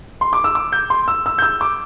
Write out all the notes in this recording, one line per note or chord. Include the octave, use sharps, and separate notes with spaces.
C6
D6
E6
D6
G6
C6
E6
E6
G6
E6
D6